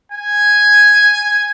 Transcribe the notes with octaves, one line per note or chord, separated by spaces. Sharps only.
G#5